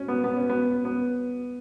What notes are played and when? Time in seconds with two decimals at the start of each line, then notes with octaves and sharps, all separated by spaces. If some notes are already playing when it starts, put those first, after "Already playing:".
Already playing: C#4
0.08 B3
0.24 B3
0.37 C#4
0.50 B3
0.85 B3